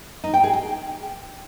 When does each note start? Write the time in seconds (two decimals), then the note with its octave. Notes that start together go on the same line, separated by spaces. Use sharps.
0.24 D#4
0.34 G5
0.43 G#4
0.53 G5